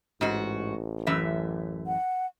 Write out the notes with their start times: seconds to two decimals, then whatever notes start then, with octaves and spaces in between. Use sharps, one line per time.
0.21 A1 G#2 F#4
1.07 F#2 E3 E5
1.87 F#5